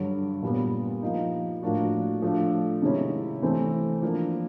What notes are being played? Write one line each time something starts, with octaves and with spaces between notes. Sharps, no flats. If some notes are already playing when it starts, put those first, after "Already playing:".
Already playing: G2 D3 F#3
A#2 G3 B3
F3 A#3 D#4
A2 F3 A#3 D4 F#4
F3 A3 D4
C3 D#3 G#3 C#4 E4
C3 E3 A3 C4
F3 A#3 D4